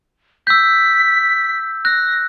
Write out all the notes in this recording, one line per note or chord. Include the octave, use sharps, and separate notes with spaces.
E6 G6 B6
F#6 A#6